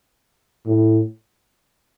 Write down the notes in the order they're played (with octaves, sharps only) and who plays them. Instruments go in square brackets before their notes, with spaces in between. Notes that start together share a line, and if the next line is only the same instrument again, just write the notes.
[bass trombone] A2